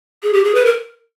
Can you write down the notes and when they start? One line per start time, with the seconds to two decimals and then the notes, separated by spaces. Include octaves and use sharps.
0.23 G#4
0.33 G4
0.44 G#4
0.55 B4
0.65 A#4